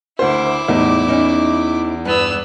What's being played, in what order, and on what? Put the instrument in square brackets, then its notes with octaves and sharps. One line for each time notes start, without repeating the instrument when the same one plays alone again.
[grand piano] D2 C5 [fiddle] E4 D6
[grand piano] E2 [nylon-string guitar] A2 G3 D#4
[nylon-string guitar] E3 C#4 D#4
[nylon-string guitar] G2 [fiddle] B3 E6